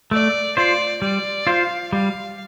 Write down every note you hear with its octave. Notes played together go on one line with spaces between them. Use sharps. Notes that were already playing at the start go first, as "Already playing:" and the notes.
A3 D5
F4 C5 D5
G3 D5
F4 C5 F5
G3 F5